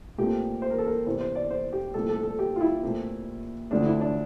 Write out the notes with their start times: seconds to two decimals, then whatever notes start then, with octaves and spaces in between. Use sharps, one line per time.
0.18 A#2 A3 C4 G4
0.62 C5
0.70 A#4
0.78 A4
0.86 A#4
1.06 E2 C3 E3 C5
1.21 C5
1.35 D5
1.50 C5
1.73 G4
1.94 C2 A#2 A3 C4 A4
2.09 A4
2.23 A4
2.39 G4
2.56 F4
2.61 E4
2.83 A#2 A3 C4
3.71 D2 D3 F3 A3 C4 D4
3.86 E4
4.01 D4